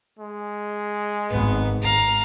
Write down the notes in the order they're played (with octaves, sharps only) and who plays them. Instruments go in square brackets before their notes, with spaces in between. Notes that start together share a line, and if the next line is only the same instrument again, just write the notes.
[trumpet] G#3
[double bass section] G#1 G#2 [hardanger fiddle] B3
[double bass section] G#1 [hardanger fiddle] F5 A#5